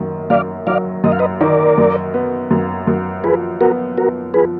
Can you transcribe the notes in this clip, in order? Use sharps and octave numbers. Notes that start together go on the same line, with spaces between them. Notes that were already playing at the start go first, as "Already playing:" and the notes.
Already playing: F#2 D#3
F#2 D5 F5
F#3 D5 F5
F#2 D#5
F5
B4 D#5
D#3 A#4 D5
F#2
B3
F#2
F#2
F3 G#4 B4
B3 F#4 A#4
B3 F#4 A#4
F3 G#4 B4